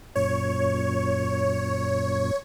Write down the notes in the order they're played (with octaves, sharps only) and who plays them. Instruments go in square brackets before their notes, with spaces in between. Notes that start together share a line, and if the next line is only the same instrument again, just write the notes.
[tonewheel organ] F#2 A#2 [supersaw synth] C#5